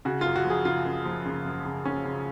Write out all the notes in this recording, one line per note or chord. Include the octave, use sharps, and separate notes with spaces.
C#3 F#4
F#2 F4
F#4
F3 G#4
C#3 F4
F#2
F3
C#3
F#2
C#3
C#3 C#4
C#3